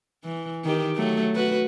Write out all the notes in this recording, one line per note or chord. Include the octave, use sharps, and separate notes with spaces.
E3
D#3 G4
F#3 A3
F#4 B4